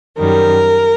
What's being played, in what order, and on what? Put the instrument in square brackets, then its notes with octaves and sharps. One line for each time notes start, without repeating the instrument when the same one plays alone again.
[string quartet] F#2 D#3 G3 A#4